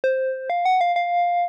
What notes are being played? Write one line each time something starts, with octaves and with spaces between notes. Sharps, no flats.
C5
F5
F#5
F5
F5